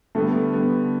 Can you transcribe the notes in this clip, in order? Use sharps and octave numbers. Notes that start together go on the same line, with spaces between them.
D3 G3 A3 B3
D3 G3 B3